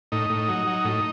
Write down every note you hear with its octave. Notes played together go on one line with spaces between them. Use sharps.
A2 D#4
A2
F#3
F#3
A2